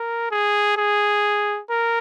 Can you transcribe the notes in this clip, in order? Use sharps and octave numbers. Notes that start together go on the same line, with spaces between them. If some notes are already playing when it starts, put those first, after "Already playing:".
Already playing: A#4
G#4
G#4
A#4